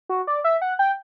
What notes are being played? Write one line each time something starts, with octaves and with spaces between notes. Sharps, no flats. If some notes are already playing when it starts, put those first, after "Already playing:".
F#4
D5
E5
F#5
G5